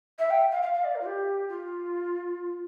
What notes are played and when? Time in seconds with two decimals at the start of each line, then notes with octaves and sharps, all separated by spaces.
0.19 E5
0.30 G5
0.52 F5
0.62 F5
0.74 F5
0.84 D5
0.95 A#4
1.01 F4
1.06 G4
1.49 F4